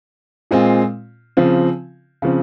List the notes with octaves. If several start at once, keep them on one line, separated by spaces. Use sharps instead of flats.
A#2 G#3 C4 F4
C#3 F3 C4
C#3 F3 C4